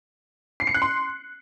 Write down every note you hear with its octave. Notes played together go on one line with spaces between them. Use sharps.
C7
C#7
F#6
C6